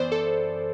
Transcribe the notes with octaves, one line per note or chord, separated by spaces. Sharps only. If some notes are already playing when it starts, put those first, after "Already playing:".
Already playing: F#2 E3 B3 C5 D5
A4